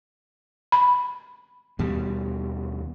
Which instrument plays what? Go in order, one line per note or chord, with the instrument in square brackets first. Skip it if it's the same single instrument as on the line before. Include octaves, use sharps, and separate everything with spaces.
[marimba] B5
[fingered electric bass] D#2 B2 G3